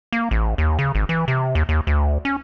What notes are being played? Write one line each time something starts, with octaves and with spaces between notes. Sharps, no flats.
A#3
A1
D#2
C#3
G#1
E3
C3
D#2
D#2
D2
C#4